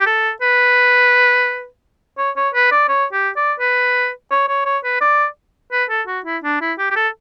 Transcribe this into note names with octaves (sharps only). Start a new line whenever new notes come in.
G4
A4
B4
C#5
C#5
B4
D5
C#5
G4
D5
B4
C#5
C#5
C#5
B4
D5
B4
A4
F#4
E4
D4
E4
G4
G4
A4